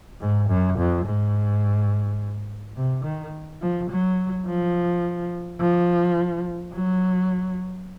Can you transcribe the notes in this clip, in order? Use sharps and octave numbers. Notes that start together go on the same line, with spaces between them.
G#2
F#2
F2
G#2
C3
D#3
F3
F#3
F3
F3
F#3